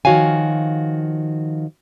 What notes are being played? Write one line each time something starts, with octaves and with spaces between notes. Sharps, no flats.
D#3 F3 F#4 C#5 F5 G#5